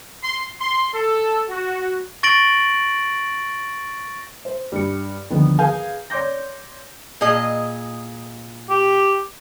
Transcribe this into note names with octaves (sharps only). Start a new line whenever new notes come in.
C6
C6
A4
F#4
C#6 A6 A#6 D7 F#7
C5
G2 C#7
D2 D3 D#3 F3 B3
G#4 A#4 B4 F5 G#5 G6
C#5 D5 C6 D6 G6 A#6
A#2 G#4 D#5
G4